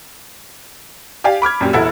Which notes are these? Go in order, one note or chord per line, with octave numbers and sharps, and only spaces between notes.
G4 D5 F5 G#5
B5 D6 F6 G#6
F#2 A#2 G4
E1 E4 A4 F#5 E6